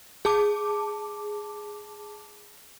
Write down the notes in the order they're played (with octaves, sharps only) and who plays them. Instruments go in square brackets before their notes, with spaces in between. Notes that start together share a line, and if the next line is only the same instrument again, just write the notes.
[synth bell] G#4 A5 D6